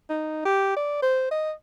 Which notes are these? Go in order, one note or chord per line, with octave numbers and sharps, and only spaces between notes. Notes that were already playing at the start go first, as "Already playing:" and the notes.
D#4
G4
D5
C5
D#5